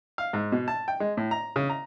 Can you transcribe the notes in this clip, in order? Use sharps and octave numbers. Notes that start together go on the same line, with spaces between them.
F5
G#2
B2
A5
G5
G#3
A2
A#5
C#3
A#5